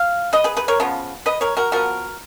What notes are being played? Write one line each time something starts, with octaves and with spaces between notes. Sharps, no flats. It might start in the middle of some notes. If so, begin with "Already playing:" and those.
Already playing: F5
B4 D#5
G#4 B4
G#4 B4
A#4 C#5
C#3 F3 B3
B4 D#5
A#4 C#5
F#4 A#4
F3 B3 F#4 A#4